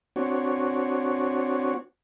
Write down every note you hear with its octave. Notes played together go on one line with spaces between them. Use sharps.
C4 D4 F#4 C#5